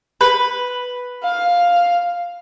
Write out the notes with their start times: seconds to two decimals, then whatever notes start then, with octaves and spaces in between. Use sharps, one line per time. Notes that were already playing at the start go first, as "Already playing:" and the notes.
0.21 B4
1.23 F5